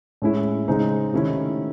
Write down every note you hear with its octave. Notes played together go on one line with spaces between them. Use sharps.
A2 G#3 C#4 E4
C#3 G#3 C4 D#4
C3 D#3 A3 C#4 E4